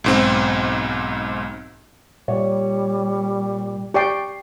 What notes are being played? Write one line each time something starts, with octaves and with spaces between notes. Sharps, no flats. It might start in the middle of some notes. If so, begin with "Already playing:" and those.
B1 G#2 C4
A#2 G3 C#5 D5
G4 D5 G5 C#6 C7